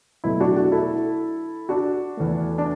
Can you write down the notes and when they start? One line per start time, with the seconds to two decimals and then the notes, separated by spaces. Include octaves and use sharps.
0.24 B2 F#3 A3 E4
0.40 D4 F#4
0.57 D4 F#4
0.72 E4 A4
1.69 D4 F#4
2.17 E2 E3 A3
2.58 D4